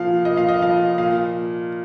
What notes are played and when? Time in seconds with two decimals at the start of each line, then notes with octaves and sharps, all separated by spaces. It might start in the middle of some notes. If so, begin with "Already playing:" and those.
Already playing: A#2 F3 F5
0.25 A#2 D#5
0.37 F5
0.48 D#5
0.62 F3 F5
0.98 A#2 F5